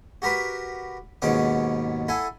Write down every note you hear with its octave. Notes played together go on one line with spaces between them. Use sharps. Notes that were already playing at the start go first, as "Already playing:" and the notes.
F#4 G4 A#4 B4 B5
D#2 G#2 B2 C#4 F#5 D6
E4 A4 F#5 G#5